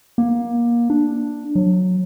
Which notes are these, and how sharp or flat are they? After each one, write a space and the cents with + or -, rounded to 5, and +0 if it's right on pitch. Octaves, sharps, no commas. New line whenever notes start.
A#3 +25
D4 +5
F#3 -15